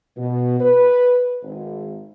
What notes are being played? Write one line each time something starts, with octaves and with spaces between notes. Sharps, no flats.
B2
B4
G#1